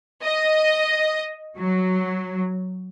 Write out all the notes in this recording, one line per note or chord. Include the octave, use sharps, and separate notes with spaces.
D#5
F#3